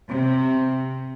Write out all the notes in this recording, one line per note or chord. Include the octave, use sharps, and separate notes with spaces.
C3